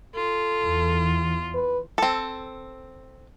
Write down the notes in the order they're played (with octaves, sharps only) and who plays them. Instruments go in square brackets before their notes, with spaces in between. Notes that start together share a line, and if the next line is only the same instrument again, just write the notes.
[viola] F4 [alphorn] A4
[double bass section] E2
[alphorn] B4
[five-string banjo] C4 A4